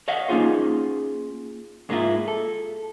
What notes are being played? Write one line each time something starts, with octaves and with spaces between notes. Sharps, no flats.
C#5 D#5 F5 F#5
A#3 C#4 D#4 F4 G#4 C5
G#2 G#3 A#3 D4 E4 F4
A4